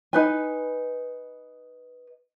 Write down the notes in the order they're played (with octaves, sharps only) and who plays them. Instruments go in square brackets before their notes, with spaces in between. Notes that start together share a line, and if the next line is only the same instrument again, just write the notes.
[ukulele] D#4 B4 G#5